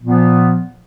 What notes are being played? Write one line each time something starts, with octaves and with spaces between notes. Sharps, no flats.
A#2 F3 B3